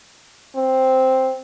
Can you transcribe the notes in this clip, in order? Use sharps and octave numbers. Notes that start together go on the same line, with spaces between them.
C4